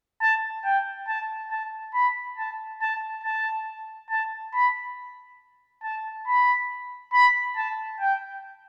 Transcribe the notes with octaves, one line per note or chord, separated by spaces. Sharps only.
A5
G5
A5
A5
B5
A5
A5
A5
A5
B5
A5
B5
B5
A5
G5